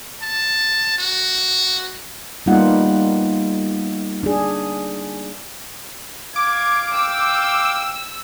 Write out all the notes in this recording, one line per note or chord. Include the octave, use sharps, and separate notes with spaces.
A5
F#4
G3 A#3 B3 D#4 F4 F#5
D4 G#4
F5 D6 G#6
G5 E6